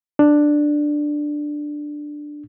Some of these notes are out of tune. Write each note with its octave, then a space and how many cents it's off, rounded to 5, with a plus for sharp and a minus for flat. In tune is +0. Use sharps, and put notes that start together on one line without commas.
D4 +10